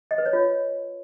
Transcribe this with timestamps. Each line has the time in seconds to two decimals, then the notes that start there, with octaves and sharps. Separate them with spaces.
0.11 D#5
0.18 B4
0.26 C#5
0.33 F4